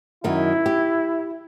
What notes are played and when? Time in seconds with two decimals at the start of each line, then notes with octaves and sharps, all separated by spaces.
0.24 F#2 D#3 D#4 E4
0.66 G4